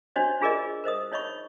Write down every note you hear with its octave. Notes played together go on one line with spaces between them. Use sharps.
D4 F#4 C5 C#5 D#5
D4 F4 G#4 A#4 D5 D#5
A#4 C5 D#5 D#6
D#4 C#5 D#5 B5 C#6